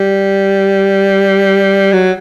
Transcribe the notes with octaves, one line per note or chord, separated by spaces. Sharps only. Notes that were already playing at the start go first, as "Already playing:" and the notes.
Already playing: G3
F#3